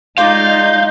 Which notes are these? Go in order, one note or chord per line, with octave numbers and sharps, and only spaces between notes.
G#3 D#4 F4 D5 F5 G6